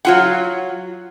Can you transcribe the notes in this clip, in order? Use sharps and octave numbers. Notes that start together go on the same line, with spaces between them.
F#3 F4 F#5